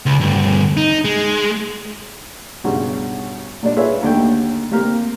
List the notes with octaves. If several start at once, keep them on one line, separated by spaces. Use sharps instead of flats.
C#2
D2 G2
D#4
G#3
B1 G2 C#3
A#2 G3 D4
F4 G#4 B4 C#5 E5
D#2 D3 A3 G5
C3 A#3 G4 A#4